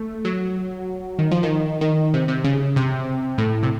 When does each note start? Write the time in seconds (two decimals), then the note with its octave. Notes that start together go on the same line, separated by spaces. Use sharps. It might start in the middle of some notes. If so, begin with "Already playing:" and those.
Already playing: A3
0.25 F#3
1.19 D#3
1.31 F3
1.43 D#3
1.81 D#3
2.14 C3
2.28 C3
2.44 C#3
2.76 C3
3.38 A2
3.63 C3